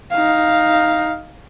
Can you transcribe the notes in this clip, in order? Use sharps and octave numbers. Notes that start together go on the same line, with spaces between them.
D#4 F5